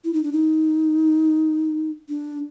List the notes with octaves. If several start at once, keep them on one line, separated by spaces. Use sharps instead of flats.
E4
D#4
D4
D#4
D4